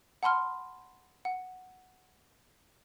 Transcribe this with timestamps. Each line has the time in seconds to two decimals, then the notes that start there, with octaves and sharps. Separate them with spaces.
0.23 F#5 A5 B5 C6 F6
1.25 F#5